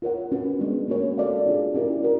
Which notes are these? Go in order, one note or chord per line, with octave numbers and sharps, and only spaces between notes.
F4 A#4 C#5 F#5
C#4 F#4 B4
G#3 B3 D4
A#3 C#4 F#4 A#4 C#5
F#4 A4 D5 F5
D4 F4 G#4
C#4 E4 G4 A#4 D5
F#4 A#4